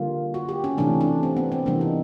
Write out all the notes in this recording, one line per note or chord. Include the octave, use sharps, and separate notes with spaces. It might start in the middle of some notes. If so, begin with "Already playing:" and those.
Already playing: D3 G3 A#3 F4
F#4
G4
C#4
C3 E3 A3 D4
D4
C4
B3
C4
C3 E3 G3 A#3 D4
D#4